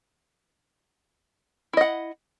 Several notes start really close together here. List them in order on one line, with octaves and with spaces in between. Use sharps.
E4 D#5 F#5